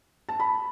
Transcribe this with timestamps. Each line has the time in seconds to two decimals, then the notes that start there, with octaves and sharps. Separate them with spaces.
0.29 A5
0.40 B5